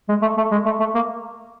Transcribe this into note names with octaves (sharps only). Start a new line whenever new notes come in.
G#3
A3
A3
G#3
A3
A3
A#3